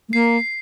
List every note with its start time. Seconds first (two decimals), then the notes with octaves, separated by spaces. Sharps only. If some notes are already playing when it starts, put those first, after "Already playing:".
0.09 A3
0.13 A#3 C7